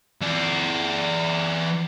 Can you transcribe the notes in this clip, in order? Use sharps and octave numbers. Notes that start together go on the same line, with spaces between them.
E3 D5